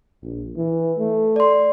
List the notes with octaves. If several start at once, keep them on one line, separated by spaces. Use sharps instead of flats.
A#1
E3
A3
D5 C6